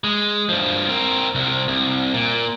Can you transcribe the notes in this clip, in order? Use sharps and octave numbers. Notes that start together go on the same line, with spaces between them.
G#3
G2 F3
C4 A#4
C2 C3
C2
A#2